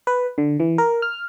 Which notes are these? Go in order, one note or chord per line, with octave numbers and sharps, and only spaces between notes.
B4
D3
E3
A#4
F6